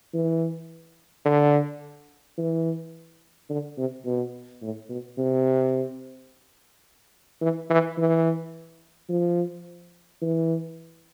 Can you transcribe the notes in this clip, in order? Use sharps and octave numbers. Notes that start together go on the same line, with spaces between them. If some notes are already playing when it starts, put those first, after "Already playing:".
E3
D3
E3
D3
C3
B2
A2
B2
C3
E3
E3
E3
F3
E3